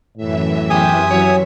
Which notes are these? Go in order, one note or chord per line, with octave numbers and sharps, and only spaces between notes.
F#2 A2 E3 E5
E2 C3 G4 G#5 D#6
F#3 C#5